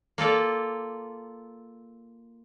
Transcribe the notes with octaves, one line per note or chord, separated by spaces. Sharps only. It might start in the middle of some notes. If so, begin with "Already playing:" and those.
A#3 F4 A4 D5